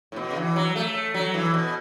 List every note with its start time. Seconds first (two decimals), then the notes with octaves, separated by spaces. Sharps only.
0.12 A2
0.16 B2
0.31 C#3
0.36 E3
0.56 F#3
0.76 A3
1.14 F#3
1.34 E3
1.54 B2